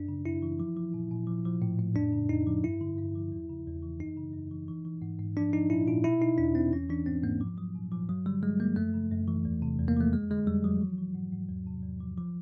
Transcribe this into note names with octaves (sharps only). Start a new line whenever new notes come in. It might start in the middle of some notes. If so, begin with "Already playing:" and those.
Already playing: F#2 D4
C#3
F#2 E4
E3
F3
F3
A#2
A#2
F3
F3
A2
A2
F2 D4
C#3
F2 D#4
F3
G2 E4
D3
G2
F3
E2
C#3
E2
E3
F#2 D#4
C#3
F#2
E3
E3
E3
G#2
G#2
F3 D4
F3 D#4
A#2 E4
A#2 F4
B2 E4
B2 D#4
E2 D4
E2 C4
E3 C#4
E3 D4
G#2 C4
G#2 A#3
F3
F3 F#3
A#2
A#2 F3
G2 F#3
D3 G3
G2 G#3
F3 A#3
F#2 A3
C#3
F#2
E3
E2
C3
E2
A#3
F3 A3
F2 G#3
D3 G#3
F2 G3
F3 F#3
E3
E3
G#2
G#2
E2
C3
E2
F3
F3